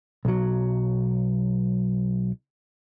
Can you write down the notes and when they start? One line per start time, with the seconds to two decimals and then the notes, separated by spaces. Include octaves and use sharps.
0.25 B1 F#3